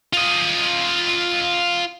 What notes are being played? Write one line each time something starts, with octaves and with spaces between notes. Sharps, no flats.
F4 D#5